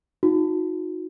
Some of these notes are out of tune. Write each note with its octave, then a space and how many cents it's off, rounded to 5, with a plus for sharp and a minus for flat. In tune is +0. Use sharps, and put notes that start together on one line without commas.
D#4 +20 F#4 -30